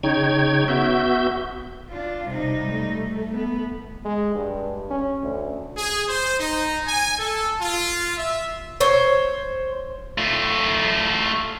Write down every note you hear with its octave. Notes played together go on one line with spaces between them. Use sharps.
C#3 D#4 C#5 G5 G#6
B3 F#4 E5 G6
D4 F4
C3 G3 D#4
A3
B3
G#3
G2
C#4
D2
G#4
C5
D#4
G#5
A4
F4
E5
C5 C#5
A3 F4